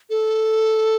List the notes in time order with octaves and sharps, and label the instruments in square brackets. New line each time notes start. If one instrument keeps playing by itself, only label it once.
[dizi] A4